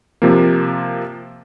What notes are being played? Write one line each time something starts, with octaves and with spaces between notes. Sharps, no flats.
C3 F3 A#3